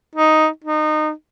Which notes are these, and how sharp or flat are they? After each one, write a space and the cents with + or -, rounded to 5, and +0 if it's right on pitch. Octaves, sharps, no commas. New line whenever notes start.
D#4 +5
D#4 -25